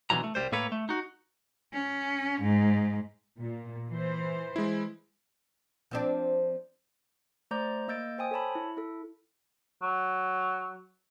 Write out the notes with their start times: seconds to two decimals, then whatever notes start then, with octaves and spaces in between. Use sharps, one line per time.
0.10 B2 D3 E3 F#3 A#5
0.24 A3
0.35 C2 C3 G3 C5
0.52 A2 A#3 A4 B4 C#5 A#5
0.72 A3
0.89 D#4 F#4
1.73 C#4
2.41 G#2
3.41 A#2
3.89 E3 C5
4.56 G#3 E4
5.91 F3 C4 D4
7.51 A3 C5 D5 A#5 D6 G6
7.88 A#3 D#5 E6 G6 A6 D7
8.18 C5 G5 G#5 D#6
8.31 A4 C#5 A5 B5
8.55 E4
8.77 E4 A4
9.82 F#3